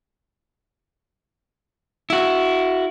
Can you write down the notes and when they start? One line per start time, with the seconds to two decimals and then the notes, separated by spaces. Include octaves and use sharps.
2.10 E4 F#4